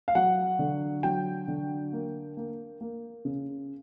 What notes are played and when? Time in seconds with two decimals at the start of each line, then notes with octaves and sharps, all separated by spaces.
0.08 F5
0.15 F#3 F#5
0.59 D3
1.03 F#3 G5
1.48 D3
1.93 A#3
2.37 A#3
2.81 A#3
3.25 C#3